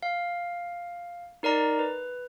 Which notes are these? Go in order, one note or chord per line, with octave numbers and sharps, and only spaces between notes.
F5
D#4 A#4 D5 A#5
B4